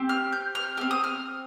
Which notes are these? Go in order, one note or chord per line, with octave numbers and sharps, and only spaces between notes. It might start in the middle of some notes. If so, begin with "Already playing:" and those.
Already playing: C4 G4
F6
G6
F6
C4 G4 F6
D#6
F6